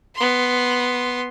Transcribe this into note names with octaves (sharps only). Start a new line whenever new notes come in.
B3 C6